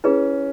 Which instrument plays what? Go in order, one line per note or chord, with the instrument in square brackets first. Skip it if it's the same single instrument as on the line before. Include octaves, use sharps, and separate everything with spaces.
[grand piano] C#4 [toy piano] E4 G#4 B4